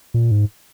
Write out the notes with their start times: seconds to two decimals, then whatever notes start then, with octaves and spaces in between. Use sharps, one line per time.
0.14 A#2
0.31 G#2